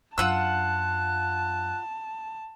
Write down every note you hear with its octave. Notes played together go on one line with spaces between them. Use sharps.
F#2 D4 F4 F#5 A5 E6 F#6